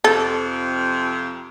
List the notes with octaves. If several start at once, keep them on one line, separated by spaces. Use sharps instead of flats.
F2 C3 A4